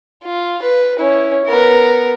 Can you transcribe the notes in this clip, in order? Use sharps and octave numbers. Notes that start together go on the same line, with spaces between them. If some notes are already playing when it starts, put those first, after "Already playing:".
F4
B4
C#4 E4
B3 A#4